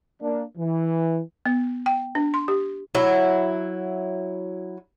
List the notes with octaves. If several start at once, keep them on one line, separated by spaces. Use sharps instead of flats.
A#3 D4
E3
B3
G5
D4
C6
G4
F#3 E4